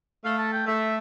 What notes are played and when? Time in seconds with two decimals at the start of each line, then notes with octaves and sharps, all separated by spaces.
0.24 A3 F5
0.38 A5
0.53 G5
0.66 A3 E5